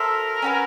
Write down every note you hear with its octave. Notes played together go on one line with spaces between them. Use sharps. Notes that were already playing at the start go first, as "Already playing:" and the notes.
Already playing: F#4 A4 A#4 C5 E5
C#4 F#4 B4